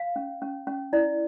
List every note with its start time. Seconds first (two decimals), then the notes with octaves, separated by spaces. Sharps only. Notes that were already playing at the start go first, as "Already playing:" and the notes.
Already playing: F5
0.16 C#4
0.42 C#4
0.67 C#4
0.93 E4 D5